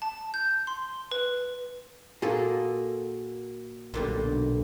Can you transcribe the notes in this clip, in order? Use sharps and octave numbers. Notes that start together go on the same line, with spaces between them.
A5
G6
C6
B4
A#2 A#3 F#4 G#4 A4
B1 A#2 D3 G3